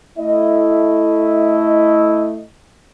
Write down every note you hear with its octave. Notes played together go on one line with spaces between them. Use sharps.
A3 E4 D#5